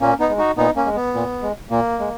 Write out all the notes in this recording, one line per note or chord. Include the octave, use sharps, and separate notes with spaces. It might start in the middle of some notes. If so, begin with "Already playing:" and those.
A#2 A#3 C#4
B3 D#4
G#3
D#4 F#4
A#2 B3 D#4
A#3 C#4
G#3
B3
A#2
G#3
A#2 A#3
G#3